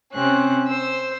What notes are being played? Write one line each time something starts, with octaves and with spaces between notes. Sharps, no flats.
C3 C4 C#4 F#6
C5 E6